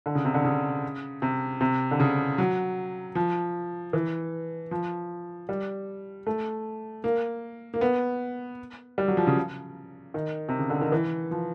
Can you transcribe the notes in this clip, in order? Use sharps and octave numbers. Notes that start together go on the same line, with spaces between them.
D3
C#3
C3
D3
C#3
C3
C3
D3
C#3
F#3
F3
E3
F3
G3
A3
A#3
A#3
B3
G3
F#3
F3
C#3
D#3
C3
C#3
D3
D#3
E3
F3